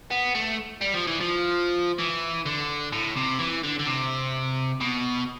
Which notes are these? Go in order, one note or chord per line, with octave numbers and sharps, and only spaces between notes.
B3
A3
G3
F3
E3
F3
E3
D3
A2
C3
E3
D3
D3
C3
B2